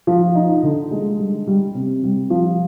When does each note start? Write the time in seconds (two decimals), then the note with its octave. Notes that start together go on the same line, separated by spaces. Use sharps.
0.07 F3
0.35 D#4
0.63 D3
0.91 G#3
1.19 G3
1.47 G3
1.75 C3
2.03 G3
2.30 F3